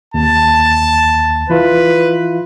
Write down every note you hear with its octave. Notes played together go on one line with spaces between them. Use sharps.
D#2 A5
E3 E4 F4 B4